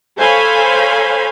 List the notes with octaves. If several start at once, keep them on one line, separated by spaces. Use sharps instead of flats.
A4 C5 C#5 F5 G#5 B5